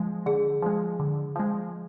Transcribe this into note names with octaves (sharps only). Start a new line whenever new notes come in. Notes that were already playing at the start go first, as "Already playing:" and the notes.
Already playing: F3 G#3
D3 G#4
F3 G#3
D3
F3 G#3